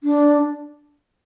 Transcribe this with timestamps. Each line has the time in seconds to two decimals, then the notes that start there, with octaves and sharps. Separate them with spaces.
0.03 D4